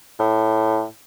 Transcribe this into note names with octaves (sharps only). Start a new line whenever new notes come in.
A2